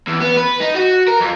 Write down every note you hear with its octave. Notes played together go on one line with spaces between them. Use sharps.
E2
B3
B4
D#4
F#4
A#4
F2